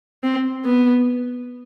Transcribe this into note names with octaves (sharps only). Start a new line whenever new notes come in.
C4
B3